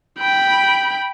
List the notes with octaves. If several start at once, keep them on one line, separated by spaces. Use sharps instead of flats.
G5 B5